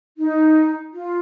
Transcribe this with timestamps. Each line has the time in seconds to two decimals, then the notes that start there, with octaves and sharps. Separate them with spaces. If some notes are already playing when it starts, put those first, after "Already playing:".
0.18 D#4
0.93 F4